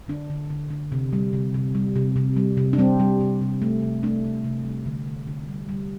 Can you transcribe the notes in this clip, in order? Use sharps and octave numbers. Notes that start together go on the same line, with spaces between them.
D3 D4
D3
D3
D3
C3
G3
C3
C3
G3
C3
C3
G3
C3
D4
G3 C4
G3
C3
C3
A3
C3
A3 D4
C3
C3
G3
D3
D3
D3
G3
G3